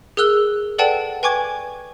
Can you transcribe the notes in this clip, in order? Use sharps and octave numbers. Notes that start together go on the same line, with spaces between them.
G#4 A#4 E6 F#6 G7
A4 B4 D5 F#5 G5 A5
B4 G5 G#5 C#6 D6 G#6